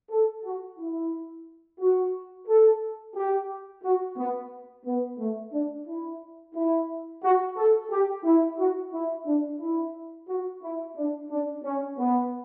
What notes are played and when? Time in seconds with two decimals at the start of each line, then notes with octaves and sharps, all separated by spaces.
0.10 A4
0.44 F#4
0.79 E4
1.80 F#4
2.48 A4
3.16 G4
3.83 F#4
4.17 B3
4.85 B3
5.18 A3
5.53 D4
5.87 E4
6.55 E4
7.23 F#4
7.57 A4
7.91 G4
8.24 E4
8.58 F#4
8.93 E4
9.26 D4
9.60 E4
10.28 F#4
10.62 E4
10.96 D4
11.30 D4
11.63 C#4
11.98 B3